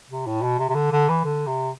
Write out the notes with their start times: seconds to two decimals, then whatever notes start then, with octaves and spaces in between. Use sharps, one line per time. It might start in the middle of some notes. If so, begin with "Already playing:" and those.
0.10 C3
0.27 A2
0.43 B2
0.59 C3
0.69 C3
0.75 D3
0.92 D3
1.09 E3
1.24 D3
1.47 C3